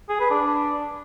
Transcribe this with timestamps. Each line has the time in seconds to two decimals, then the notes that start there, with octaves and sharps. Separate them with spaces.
0.09 G#4
0.20 B4
0.31 D4